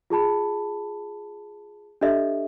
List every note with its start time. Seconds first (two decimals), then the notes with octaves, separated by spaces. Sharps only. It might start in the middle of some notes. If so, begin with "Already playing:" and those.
0.10 F4 G#4 A5 B5
2.01 D4 G4 A4 D#5 E5